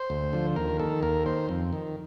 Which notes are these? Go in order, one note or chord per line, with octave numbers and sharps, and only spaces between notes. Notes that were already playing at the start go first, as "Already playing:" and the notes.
Already playing: C5
D2
D3 F3
D#2 A#4
D#3 A4
D#2 A#4
D#3 C5
F2
D#3